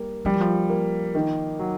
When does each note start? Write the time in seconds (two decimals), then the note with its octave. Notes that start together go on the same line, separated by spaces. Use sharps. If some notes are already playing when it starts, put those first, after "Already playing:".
Already playing: G3 A#3
0.25 F3 G3
0.33 E3
0.40 F3
0.69 A#3
1.15 D#3
1.59 F#3